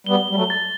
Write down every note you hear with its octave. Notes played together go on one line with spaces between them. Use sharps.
G3 B3 G7
G3
F#3 A3
A6